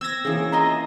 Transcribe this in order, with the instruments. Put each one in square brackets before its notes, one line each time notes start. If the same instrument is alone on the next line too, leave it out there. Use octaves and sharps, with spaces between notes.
[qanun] C4 [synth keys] E6 G#6 A#6
[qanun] E3 A#3 [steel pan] C#4 G#4
[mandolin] F4 D#5 A#5